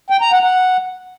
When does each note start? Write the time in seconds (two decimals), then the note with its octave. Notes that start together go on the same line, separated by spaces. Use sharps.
0.10 G5
0.21 A#5
0.32 F#5
0.43 F#5